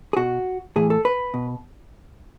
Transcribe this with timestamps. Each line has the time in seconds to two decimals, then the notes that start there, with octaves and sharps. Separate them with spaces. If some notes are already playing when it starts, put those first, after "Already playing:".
0.13 G#4
0.17 B2 F#4
0.76 A2 E3 G#4
0.90 A4
1.05 B4
1.34 B2